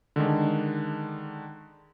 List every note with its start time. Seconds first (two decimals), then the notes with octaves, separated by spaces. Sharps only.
0.16 D3 D#3 G#3 D4